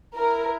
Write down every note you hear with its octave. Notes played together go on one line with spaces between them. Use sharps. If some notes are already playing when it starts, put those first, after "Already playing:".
E4 A#4